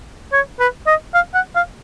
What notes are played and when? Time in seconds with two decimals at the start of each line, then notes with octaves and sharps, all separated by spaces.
0.32 C#5
0.59 B4
0.87 D#5
1.14 F5
1.34 F#5
1.56 F5